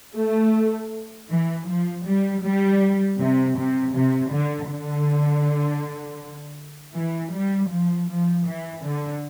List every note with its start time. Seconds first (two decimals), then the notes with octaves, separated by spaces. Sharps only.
0.16 A3
1.30 E3
1.68 F3
2.06 G3
2.43 G3
3.19 C3
3.57 C3
3.94 C3
4.31 D3
4.70 D3
6.96 E3
7.34 G3
7.71 F3
8.10 F3
8.47 E3
8.84 D3